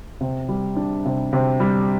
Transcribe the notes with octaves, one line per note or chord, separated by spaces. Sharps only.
C3
G3
D4
C3
C3
G3